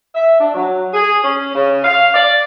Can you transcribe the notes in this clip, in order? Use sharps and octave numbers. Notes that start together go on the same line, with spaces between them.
E5
D4
F#3
G#4
C#4
C#3
F5
D5